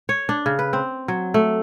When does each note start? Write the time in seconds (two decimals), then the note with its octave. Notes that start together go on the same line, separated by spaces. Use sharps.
0.09 C#5
0.29 D4
0.46 C#3
0.59 B4
0.73 C4
1.08 F#3
1.34 A3